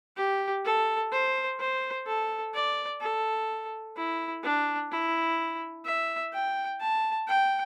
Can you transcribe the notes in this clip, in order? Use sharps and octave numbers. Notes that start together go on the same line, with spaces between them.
G4
A4
C5
C5
A4
D5
A4
E4
D4
E4
E5
G5
A5
G5